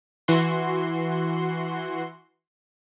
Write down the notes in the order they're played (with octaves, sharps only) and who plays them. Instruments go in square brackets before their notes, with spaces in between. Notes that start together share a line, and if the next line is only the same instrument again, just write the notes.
[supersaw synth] E3 F#4 C6